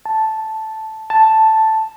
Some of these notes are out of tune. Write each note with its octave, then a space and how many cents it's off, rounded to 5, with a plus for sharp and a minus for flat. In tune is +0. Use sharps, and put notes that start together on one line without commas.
A5 -5
A5 +0